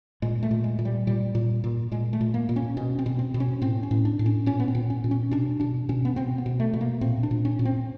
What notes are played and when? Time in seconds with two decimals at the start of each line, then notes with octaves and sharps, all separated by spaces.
0.22 A#2 G#3
0.43 A3
0.51 A#2
0.64 G#3
0.79 A#2
0.85 G3
1.07 A#2 G3
1.35 A#2
1.64 A#2
1.91 A#2 G#3
2.13 A3
2.21 A#2
2.34 A#3
2.49 A#2
2.56 C#4
2.77 B2 C#4
2.99 C4
3.06 B2
3.19 C4
3.34 B2
3.40 C#4
3.62 A2 C4
3.83 C#4
3.91 A2
4.05 D4
4.19 A2
4.26 C#4
4.46 A#2 C#4
4.60 B3
4.68 C4
4.75 A#2
4.90 C#4
5.04 A#2
5.11 C#4
5.31 B2 D4
5.60 B2 D4
5.89 B2 C#4
6.05 B3
6.16 B2 C4
6.38 B3
6.46 B2
6.60 A3
6.74 B2
6.81 A#3
7.01 A#2 C4
7.23 D4
7.31 A#2
7.45 C#4
7.59 A#2
7.65 C4